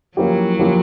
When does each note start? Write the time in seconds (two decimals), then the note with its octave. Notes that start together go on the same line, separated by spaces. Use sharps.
0.17 F3 F#3 A#3 C#4 E4 G4
0.59 F3 A#3 C#4 E4 G4